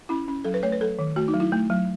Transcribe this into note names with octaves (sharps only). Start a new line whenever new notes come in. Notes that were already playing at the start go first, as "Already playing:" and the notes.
C#4 E4
C#4
F#3 A4
B4
A3 C#5
B4
F#3 A4
D#3
A3 F#4
D#4
F#3
E4
A3
F#3